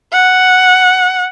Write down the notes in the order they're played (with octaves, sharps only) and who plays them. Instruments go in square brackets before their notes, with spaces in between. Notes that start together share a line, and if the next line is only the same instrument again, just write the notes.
[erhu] F#5